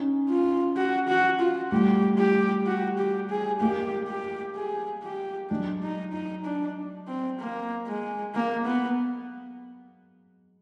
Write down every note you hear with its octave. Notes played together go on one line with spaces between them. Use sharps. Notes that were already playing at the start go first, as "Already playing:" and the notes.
Already playing: C#4 D#4
F4
F#4
F#4
F4
G3 A3 G4
G4
F#4
G4
G#4
G#3 A#3 G4
G4
G#4
G4
F#3 G#3 D4
D#4
D#4
D4
C4
A#3
G#3
A#3
B3